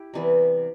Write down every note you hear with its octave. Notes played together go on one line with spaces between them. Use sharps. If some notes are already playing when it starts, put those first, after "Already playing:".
Already playing: E4 G4
C3 E3 G3 B3